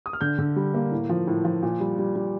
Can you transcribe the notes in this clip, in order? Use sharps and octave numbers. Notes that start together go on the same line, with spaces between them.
D#6
F6
D3 G6
D3
G3
A#3
A2
F3
A2
F3
A#2
G3
G3
G3